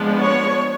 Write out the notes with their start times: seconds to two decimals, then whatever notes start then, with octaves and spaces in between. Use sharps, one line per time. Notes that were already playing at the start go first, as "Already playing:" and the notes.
Already playing: F3 G#3 B3 D4
0.18 C#5